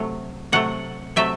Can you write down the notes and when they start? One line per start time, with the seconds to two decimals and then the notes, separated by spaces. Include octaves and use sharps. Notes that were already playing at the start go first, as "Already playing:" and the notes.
Already playing: C3 F#3 A3
0.52 C3 F#3 A3 F#5
1.16 C3 F#3 A3 E5